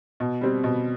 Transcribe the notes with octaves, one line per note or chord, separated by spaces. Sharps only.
B2
G3 C4
B2